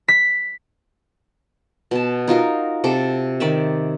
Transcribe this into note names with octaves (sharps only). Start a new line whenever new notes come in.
B6
B2 A5
D#4 F4 F#4 A#4
C3 A4 D6
D#3 D5 E5